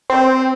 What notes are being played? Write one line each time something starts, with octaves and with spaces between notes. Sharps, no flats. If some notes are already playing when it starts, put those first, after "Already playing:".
C4